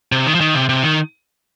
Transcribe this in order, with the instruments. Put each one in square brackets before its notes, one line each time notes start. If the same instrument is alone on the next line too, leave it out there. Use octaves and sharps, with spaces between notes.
[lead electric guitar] C3
D#3
F3
D#3
C3
C3
D#3